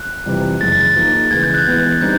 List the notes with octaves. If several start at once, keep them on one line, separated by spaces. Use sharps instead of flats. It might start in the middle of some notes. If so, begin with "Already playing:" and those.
Already playing: F#6
F2 C3 E3 G3
F#2 C#3 E3 G#3 A6
A6
F3 A#3 D#4 G#4
C#3 E3 G#3 G#6
G6
F#6
E3 G#3 B3 G#6
D3 G3 C4 D#4 G6